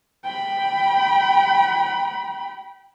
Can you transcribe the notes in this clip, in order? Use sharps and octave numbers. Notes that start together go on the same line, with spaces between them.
G5 B5